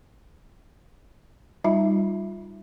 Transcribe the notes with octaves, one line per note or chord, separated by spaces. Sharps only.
G3 D#4 F4 E5 B5